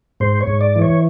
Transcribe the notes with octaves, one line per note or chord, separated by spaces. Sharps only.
G#2 C5
C#5
G#2
D5
E3
C#5